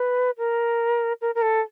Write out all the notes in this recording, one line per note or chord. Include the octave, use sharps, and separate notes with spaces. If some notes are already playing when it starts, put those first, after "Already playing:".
Already playing: B4
A#4
A#4
A#4
A4